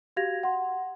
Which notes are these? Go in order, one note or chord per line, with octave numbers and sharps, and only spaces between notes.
F#4 G4 F5 G#6 A#6 F7
F#5 C6